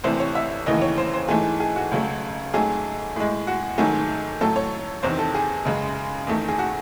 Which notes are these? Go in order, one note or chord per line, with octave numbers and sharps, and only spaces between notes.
C2 C3 E3 A3 C5
C#5
E5
D#2 C#3 E3 A3 D#5
C#5
C5
C5
G#2 E3 A3 G#4
G#4
F#4
C#2 C#3 F#3 A3
G#2 F#3 A3 G#4
A2 G#3
F#4
G#2 D#3 F#3 A3 G#4
A2 F#3 A3 A4
C#5
E2 C3 D#3 C5
A4
G#4
F#2 C#3 G#3
E2 D#3 A3
G#4
F#4